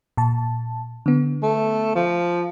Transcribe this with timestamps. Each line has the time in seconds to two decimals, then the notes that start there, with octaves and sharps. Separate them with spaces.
0.17 A#2 A5
1.06 D3 B3
1.43 A3
1.95 F3